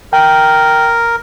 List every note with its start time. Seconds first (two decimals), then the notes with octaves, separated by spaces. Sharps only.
0.13 A#4 G5